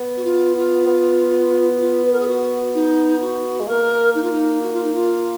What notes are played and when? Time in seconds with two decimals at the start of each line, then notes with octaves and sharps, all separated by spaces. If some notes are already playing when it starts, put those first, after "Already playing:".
Already playing: B3
0.17 F#4
0.24 F4
0.56 F4
0.87 B3
1.76 F#4
1.80 F4
2.05 B4
2.12 A#4
2.20 G#4
2.27 F#4
2.74 D#4
3.21 F#4
3.60 G#3
3.67 A#3 A#4
4.15 D#4
4.23 F4
4.31 D#4
4.61 F#4
4.73 F4
4.83 D#4
4.94 F4